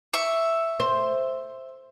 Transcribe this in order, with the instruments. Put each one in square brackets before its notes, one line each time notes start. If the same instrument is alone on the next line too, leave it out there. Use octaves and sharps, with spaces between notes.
[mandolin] E5 C#6
[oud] C5